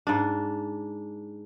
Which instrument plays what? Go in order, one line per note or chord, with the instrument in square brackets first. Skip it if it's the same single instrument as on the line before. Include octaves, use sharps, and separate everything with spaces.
[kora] G#2 D4